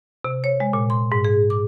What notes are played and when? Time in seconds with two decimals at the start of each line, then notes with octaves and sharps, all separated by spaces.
0.24 C3
0.44 C#5
0.60 G#3
0.73 A#2
0.90 C6
1.12 G#2
1.25 G#4
1.50 D6